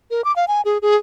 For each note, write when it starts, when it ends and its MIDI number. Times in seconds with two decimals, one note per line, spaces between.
0.11 0.24 70
0.24 0.34 86
0.36 0.45 77
0.48 0.61 80
0.65 0.78 68
0.82 0.96 68